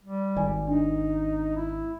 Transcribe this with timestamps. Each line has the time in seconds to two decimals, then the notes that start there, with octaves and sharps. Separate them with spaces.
0.04 G3
0.37 G#1 D5 G#5
0.67 D4 D#4
1.57 E4